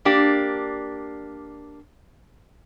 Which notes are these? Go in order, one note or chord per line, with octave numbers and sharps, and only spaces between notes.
A#3 D4 G4